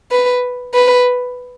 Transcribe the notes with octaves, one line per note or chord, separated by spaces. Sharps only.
B4
B4